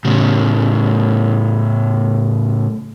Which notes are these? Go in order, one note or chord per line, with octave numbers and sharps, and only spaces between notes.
A2 C#3